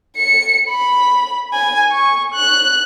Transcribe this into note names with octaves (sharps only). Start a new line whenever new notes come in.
C#7
B5
G#5
C#6
F#6